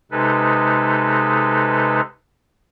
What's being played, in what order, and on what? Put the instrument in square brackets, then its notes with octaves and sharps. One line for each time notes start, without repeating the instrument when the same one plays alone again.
[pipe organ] C3 G#3 D#4 A4 B4